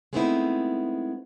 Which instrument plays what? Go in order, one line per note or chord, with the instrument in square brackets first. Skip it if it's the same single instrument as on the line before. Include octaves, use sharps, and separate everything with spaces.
[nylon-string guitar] G#3 A3 B3 C4 D#4 E4